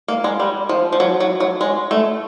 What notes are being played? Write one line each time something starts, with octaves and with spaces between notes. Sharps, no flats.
A#3
G#3
G3
F3
F3
F#3
F#3
F#3
G#3
A3